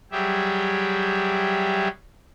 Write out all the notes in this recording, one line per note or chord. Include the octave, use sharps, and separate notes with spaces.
F#3 G3 G4 G#4 E5